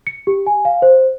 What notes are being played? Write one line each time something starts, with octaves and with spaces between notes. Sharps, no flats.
C#7
G4
G#5
F5
C5